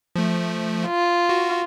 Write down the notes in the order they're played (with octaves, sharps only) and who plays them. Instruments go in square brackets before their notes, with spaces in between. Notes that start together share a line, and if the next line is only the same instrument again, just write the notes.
[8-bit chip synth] F3 A3
[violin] F4
[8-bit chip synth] F#4